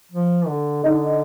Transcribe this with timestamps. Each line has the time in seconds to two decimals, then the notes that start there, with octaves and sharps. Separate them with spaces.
0.12 F3
0.48 D3
0.83 D3 D#4